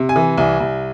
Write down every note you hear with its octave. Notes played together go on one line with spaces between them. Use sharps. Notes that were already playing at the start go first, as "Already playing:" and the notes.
Already playing: C3
G#5
E3
C2 G#5
C2